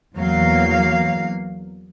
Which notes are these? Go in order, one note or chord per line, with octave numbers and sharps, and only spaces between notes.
E2 F#3 A#3 F5